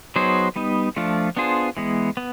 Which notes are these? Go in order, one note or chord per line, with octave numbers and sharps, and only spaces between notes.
F#3 B3 D#4 G#4 C5
G3 B3 D#4
F3 A3 D4 F4
B3 D4 F4 G#4 C5
E3 G#3 B3
B3